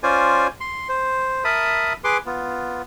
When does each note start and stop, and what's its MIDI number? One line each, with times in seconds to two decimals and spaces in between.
0.03 0.47 61
0.03 0.47 65
0.03 0.47 72
0.03 0.47 74
0.03 0.47 80
0.60 0.88 84
0.89 1.44 72
1.44 1.93 70
1.44 1.93 76
1.44 1.93 81
1.44 1.93 83
1.44 1.93 87
2.04 2.17 68
2.04 2.17 71
2.04 2.17 84
2.04 2.17 86
2.26 2.82 59
2.26 2.82 65